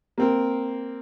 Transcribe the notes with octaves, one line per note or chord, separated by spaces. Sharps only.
A#3 C4 A#4